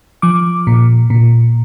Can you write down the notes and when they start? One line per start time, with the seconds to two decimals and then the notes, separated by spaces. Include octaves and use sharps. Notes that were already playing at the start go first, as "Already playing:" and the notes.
0.22 F3 D6
0.67 A#2
1.10 A#2